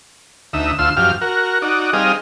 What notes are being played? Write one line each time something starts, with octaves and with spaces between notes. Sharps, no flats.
D2 D#4 E5
D2 F4 C6 E6
F#2 F3 G4 F6
F#4 A#4
D#4 F#4 D5
G3 C4 D#4 G#4 D#5 F5